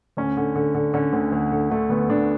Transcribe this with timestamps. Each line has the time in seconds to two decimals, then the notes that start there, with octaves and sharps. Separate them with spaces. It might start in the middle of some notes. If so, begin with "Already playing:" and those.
0.17 D2 C#4
0.37 D3
0.56 D3
0.75 D3
0.94 D3 C#4
1.13 D2
1.32 D2
1.52 D3
1.70 D3 A3
1.90 D2 B3
2.09 D2 D4